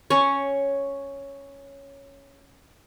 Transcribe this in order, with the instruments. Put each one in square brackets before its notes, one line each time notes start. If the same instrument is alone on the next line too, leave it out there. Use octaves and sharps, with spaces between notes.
[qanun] C#4 C#5